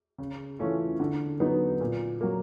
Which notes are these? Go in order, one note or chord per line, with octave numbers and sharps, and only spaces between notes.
C#3
E3 A3 C#4 F4
D3
F#3 B3 D#4
A#2
F#3 A#3